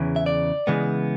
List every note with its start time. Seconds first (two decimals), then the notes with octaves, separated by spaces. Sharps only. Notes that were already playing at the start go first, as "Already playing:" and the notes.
Already playing: E2 C#3 E3
0.16 E5
0.26 D5
0.67 C#3 E3 G#3 B3